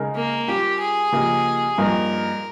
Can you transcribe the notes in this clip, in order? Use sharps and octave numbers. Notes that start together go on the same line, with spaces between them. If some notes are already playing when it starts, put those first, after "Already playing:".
Already playing: C#3 G#3 D#4 A#4
A#3
G3 C#4 F4 G4
G#4
C#3 F3 A#3 D#4 G4
G2 F3 A#3 D#4 A#4